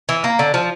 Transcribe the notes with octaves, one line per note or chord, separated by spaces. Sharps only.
E3
A#3
D3
F3